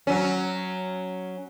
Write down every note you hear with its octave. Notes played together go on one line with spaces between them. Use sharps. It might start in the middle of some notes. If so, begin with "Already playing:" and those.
F#3 C#4